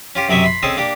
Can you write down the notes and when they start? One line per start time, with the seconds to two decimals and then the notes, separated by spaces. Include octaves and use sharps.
0.15 C#4 F4 G4
0.29 F#2 C3 F#3 D#5 E5 C#6
0.44 B5 C6
0.63 C4 C#4 G#4 A4 D#5
0.77 A#3 D4 G4